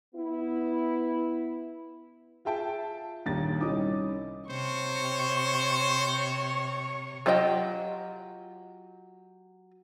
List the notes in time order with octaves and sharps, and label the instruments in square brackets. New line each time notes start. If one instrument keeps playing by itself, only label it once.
[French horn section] B3 E4
[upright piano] F4 G#4 E5 G5 A5
D#1 D#2 D4 A6
C2 C#4 D#4 E4 D6 D#6
[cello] C3 C#5 [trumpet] C5 [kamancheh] C#6
[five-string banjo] F#3 F4 G4 D#5 G5